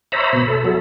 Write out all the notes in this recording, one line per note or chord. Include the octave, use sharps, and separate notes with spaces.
C5 C#5 E5 A#5 B5
B2 B5
A4
F#3 A4